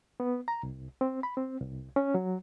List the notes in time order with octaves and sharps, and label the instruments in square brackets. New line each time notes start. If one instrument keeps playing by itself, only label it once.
[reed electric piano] B3
A#5
C2
C4
B5
C4
C2
C#4
F#3